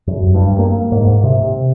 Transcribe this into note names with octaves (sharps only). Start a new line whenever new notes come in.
F#2
G2
A#3
G#2
C3